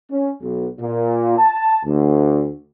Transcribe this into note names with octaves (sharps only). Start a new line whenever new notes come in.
C#4
B1
A#2
A5
D2